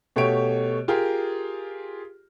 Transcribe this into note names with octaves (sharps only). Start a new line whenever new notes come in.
B2 A3 G4 C#5 D7
F4 G4 G#4 A#4